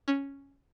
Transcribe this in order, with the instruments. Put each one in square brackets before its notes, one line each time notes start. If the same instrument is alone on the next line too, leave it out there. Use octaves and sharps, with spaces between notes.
[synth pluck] C#4